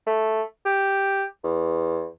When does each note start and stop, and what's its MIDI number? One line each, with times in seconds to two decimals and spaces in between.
0.07 0.42 57
0.65 1.25 67
1.44 2.07 40